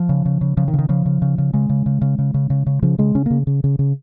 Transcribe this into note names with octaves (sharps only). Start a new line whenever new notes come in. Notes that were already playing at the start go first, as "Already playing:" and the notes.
Already playing: F3
C#3
C#3
C#3
C#3 F3
D#3
C#3
D#3
C#3 F3
C#3
C#3
C#3
C#3 G#3
C#3
C#3
C#3
C#3
C#3
C#3
C#3
C#3 F3
C#3 G#3
C#3 C#4
C#3 A#3
C#3
C#3
C#3